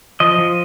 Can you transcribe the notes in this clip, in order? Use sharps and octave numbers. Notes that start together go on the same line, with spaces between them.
F3 D#5
F3